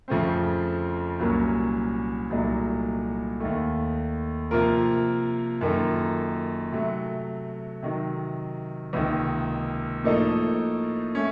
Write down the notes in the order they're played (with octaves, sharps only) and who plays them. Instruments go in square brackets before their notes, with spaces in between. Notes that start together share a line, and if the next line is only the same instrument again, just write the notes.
[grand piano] F2 C#3 F3 A3 C4
C2 A#2 F#3 A#3 C#4
C2 A#2 F#3 A3 D#4
D#2 D#3 A3
C3 F3 A#3 F4 A#4
F#2 D#3 A#3 F4 A4
C3 F#3 A3
C3 D#3 F#3
C#2 C3 D#3 A#3
A2 F3 A#3 D#4 A4
A3 C#4